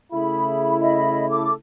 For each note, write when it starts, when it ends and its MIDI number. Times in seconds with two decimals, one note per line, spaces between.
0.12 1.53 49
0.12 1.53 57
0.12 1.53 64
0.12 0.80 68
0.12 0.80 83
0.80 1.26 75
0.80 1.26 76
0.80 1.26 83
1.30 1.53 69
1.30 1.53 86